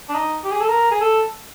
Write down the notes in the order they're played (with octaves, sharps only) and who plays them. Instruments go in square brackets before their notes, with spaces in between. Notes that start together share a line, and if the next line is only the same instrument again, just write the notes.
[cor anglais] D4
D#4
G4
G#4
A4
A#4
G#4
A4